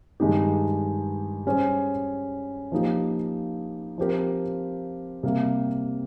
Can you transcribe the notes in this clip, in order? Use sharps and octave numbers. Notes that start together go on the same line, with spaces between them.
G2 D#3 G#3 D#4 G4
G3 C#4 G#4 C5
F3 A#3 D#4 G4
F3 C4 G4 A#4
C3 G3 A#3